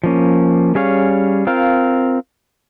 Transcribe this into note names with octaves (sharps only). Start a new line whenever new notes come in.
F3 A#3 C#4
G3 C#4 G#4 C#5 F5
C4 F4 A#4 F5